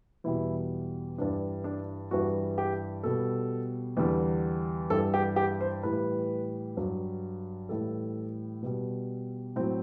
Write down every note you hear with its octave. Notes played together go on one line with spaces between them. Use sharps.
E2 B2 G3 E4
G2 E3 G3 D4
D4
G2 E3 G3 F#4
G4
B2 G3 A4
E2 D3 G3
G2 E3 G3 A4
G4
G4
C5
A2 E3 G3 B4
G2 F#3
A2 E3 G3 A4
B2 G3
A2 F#3 C4